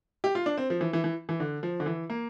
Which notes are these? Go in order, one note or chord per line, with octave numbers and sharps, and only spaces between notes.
G4
F4
D4
C4
F3
E3
E3
E3
E3
D3
F3
D3
E3
A#3